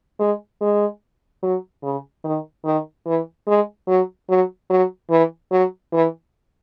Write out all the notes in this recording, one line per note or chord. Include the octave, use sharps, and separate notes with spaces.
G#3
G#3
F#3
C#3
D#3
D#3
E3
G#3
F#3
F#3
F#3
E3
F#3
E3